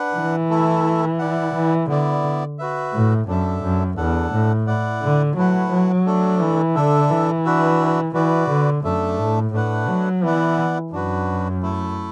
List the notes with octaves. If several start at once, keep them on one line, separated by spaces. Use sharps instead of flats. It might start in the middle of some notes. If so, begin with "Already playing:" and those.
Already playing: D4 B4 F#5
E3
A3 E4 A4 E5
E4 D5 F#5
E3
D3 B3 E4 D5
F#4 B4 E5
A2
F#2 D4 A4 E5
F#2
E2 D4 A4 F#5
A2
E4 D5 F#5
D3
F#3 A3 E4 B4 F#5
F#3
A3 D4 A4
E3
D3 D4 A4 E5
E3
D4 F#4 B4 E5
E3 F#4 B4 D5
D3
F#2 A3 D4 A4 E5
A2
A2 A3 D4 B4 F#5
F#3
E3 B3 E4 D5 F#5
F#2 D4 F#4 B4
A3 E4 A4